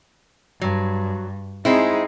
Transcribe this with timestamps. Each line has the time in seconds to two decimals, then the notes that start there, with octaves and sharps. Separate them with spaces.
0.61 G2 F#3
1.65 G#3 C4 D#4 E4 G#4